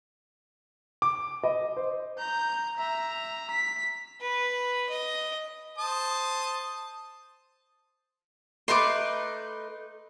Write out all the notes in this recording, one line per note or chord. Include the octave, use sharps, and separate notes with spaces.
D6
D#5
C5
A#5 G6
E5 A#5
B6
B4
D#5
C5 A5 D#6
A3 D#4 B4 C6 D6